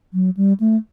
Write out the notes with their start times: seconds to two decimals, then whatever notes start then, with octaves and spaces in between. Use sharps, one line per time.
0.14 F#3
0.37 G3
0.60 A3